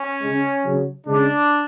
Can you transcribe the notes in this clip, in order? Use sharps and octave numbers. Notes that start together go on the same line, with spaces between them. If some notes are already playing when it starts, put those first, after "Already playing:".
Already playing: C#4
C#3 G#3
C#3 F#3
C#3 G#3 D4